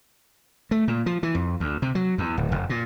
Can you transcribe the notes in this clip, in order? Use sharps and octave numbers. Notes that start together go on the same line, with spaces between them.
A3
A#2
F3
E3
F2
D2
C3
F#3
E2
D1
F1
A#2